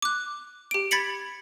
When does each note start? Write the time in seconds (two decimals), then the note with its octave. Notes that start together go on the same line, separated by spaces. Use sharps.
0.02 D6 F#6
0.71 G4 D7
0.91 B5 G#6 A6 B6 C#7 F#7